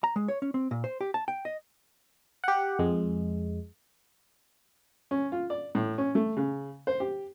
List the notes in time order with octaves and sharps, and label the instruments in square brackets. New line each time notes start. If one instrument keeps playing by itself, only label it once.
[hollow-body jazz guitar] A#5
G#3
C#5
C#4
C4
A#2
C5
G4
A5
G5
D#5
[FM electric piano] G4 F#5
F2 G#3
[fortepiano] C#4
F4
D5
A2
C#4
A3
C#3
C5
G4